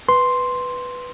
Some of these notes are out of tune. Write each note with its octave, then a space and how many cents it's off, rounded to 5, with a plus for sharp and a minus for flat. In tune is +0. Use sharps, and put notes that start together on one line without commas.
B4 +0 C6 +0